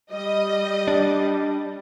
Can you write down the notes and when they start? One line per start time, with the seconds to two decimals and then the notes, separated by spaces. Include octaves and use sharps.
0.12 G3 D#5
0.88 D4